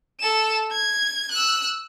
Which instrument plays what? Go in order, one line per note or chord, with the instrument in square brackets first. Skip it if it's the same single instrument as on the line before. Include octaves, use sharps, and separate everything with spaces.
[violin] A4 E7
G#6
E6 F#6